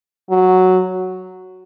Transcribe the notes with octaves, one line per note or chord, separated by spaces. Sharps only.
F#3